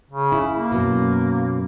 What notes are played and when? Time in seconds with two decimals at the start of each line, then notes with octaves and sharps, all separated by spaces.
0.11 C#3
0.32 E4
0.55 A#3
0.72 F#2 B2